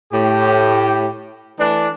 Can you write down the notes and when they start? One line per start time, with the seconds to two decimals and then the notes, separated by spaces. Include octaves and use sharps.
0.12 A2 G4
1.59 E3 A3 D4